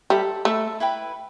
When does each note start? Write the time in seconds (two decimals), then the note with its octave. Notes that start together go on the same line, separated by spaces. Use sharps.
0.10 G3 A4 E5 B5
0.45 A3 A4 E5 B5
0.80 E4 B4 G5 B5